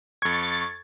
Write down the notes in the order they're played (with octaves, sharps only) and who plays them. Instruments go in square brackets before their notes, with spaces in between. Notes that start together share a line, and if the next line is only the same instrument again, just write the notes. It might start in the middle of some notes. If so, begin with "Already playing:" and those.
[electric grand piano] F2 G#6 [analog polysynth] C#6 A6